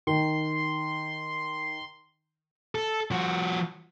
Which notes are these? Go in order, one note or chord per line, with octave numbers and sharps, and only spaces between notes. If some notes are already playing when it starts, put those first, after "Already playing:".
D#3 C6
A4
F3 F#4